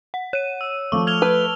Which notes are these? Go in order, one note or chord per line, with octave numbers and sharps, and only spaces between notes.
F#5
C#5 D#7
E6
F3 A3 C#6 D6
F6 G#6 F7 G7
B4 A5